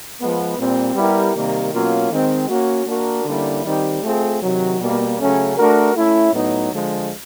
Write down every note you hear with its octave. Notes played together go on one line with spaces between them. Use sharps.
F3 G#3 B3
A#2 G3 C4
G3 B3 E4 G4 A#4
C3 D#3 G3 A#3
B2 F#3 A#3 C#4 F4
D#3 G#3 C4
A#3 C#4 F#4
A#3 D4 F#4 A#4
D3 G3 A#3 C#4 E4
D#3 G3 C4 D#4 G4
A3 C4 F4 G#4
C3 D#3 F#3
B2 G3 A#3
C#3 F#3 A3 C#4
A3 D4 F#4 A#4
A3 C#4 E4
A2 F#3 B3 D#4
D3 F3 G#3